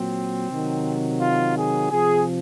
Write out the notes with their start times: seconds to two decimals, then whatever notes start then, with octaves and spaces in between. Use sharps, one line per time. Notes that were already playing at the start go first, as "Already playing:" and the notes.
Already playing: A#2 F#3 C4
0.49 C3 D#3 F#3
1.19 F4
1.55 G#4
1.90 C3 F3 G#4